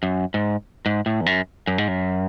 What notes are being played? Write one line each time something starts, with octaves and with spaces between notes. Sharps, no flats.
F#2
G#2
G#2
A2
E2
F#2
F#2
G#2
F#2